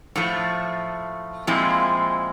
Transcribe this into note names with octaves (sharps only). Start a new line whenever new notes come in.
A2 F3 A3
A#2 F3 G#3 C4 E4